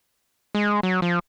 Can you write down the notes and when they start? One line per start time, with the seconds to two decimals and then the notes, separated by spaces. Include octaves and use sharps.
0.55 G#3
0.83 F#3
1.02 F3